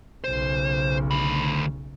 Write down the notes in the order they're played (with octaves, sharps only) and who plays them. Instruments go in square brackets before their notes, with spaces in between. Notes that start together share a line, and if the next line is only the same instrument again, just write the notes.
[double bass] B1 C#3 [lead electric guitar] C5
[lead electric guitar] D2 B5